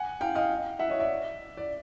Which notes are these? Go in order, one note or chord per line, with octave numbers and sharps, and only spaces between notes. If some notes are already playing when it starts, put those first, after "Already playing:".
Already playing: F#5 G#5
F5 G5
D#5 F5
E5 F#5
C#5 D#5
D5 E5
D5